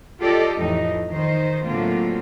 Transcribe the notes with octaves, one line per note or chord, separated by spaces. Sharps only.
F4 G4 A4 D5 D#5
F2 A2 E3 D#4
D#3 D#4 C5
A2 D3 F#3 A#3 C4 F4